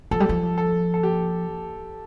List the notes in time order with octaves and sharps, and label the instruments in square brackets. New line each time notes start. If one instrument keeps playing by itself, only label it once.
[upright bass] F3 [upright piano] A4
[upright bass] G3
F3
[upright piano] A4
A4
G4